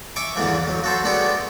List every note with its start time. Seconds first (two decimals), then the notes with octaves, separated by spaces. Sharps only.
0.16 E5 G#5 C#6 D6
0.35 E2 G#2 D3 E3 F3
0.63 F2 F#3
0.83 F#4 A4 C5
1.04 G#3 A3 B3 D4 F#4 G4